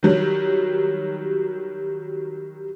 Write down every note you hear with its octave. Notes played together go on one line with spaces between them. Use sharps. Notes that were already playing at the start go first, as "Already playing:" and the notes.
D#3 F#3 G3